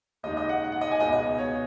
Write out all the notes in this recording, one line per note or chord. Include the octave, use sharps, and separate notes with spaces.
D#2 C#3 G#3 D#4 D#5
D#5
F#5
F#5
D#5
G#5
C#2 B2 B3 D#5
D#5
C#5